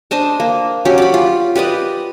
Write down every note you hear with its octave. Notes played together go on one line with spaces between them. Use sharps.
D4 C5 D#5 A5
A#3
F#3 C#4 G4
D5 B5
F4
G4 B4 D5 D#5